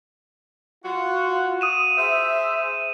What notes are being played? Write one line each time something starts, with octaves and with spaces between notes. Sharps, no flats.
F4 F#4
D#6 D#7 E7
G#4 C5 E5